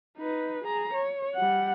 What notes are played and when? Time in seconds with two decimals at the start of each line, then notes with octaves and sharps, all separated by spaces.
0.18 D#4 B4
0.64 G#4 A#5
0.93 C#5
1.36 G3 F#5